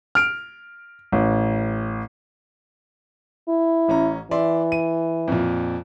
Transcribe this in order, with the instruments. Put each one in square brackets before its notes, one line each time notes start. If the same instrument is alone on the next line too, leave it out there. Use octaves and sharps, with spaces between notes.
[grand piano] F6 D7
A1
[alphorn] E4
[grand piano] A1 C#4 A#5
[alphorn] E3 [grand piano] D5 E5 C6
[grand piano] D#7
F2 A#2